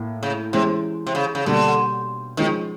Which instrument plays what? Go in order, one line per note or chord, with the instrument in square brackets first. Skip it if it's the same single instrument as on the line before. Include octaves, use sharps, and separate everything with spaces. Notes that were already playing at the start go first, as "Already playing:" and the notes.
Already playing: [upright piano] A2 A#3
[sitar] C#3
[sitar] C3 [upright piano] E3 G#3 C#4
[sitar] C3
C#3
C#3
[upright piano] B2 G3 A#3 [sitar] D3
[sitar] D#3 [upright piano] F3 G#3 C#4